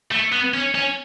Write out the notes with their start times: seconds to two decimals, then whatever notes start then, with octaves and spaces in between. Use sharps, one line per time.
0.11 A3
0.32 B3
0.54 C#4
0.75 C#4